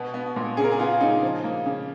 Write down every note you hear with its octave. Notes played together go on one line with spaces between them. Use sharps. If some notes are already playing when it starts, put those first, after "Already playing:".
Already playing: B2 B3
B3
A#2
C#3 G#4
A#4
G#4
B3 F4
C#3 D#4
F3
A#3
C#3